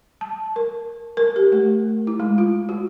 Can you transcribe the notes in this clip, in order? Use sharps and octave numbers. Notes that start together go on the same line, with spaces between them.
A5
A#4
A#4
G4
A3
E4
G#3
F4
F#4